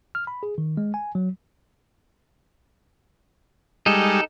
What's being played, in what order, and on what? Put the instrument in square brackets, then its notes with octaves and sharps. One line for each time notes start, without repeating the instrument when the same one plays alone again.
[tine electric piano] F6
B5
G#4
D#3
G#3
G#5
F#3
[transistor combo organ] G3 G#3 [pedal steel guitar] D#4 A4